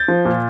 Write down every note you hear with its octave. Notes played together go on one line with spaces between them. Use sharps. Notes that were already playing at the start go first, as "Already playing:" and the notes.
Already playing: G6 A6
F3
A#2